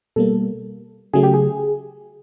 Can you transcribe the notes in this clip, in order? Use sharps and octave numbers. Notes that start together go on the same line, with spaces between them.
B2 G3 A#3 A4
C#3 F#3 A3 G#4
G4
G#4